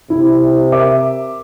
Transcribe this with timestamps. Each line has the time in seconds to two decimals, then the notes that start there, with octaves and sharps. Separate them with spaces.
0.10 C3 E4
0.72 A#4 E5 D6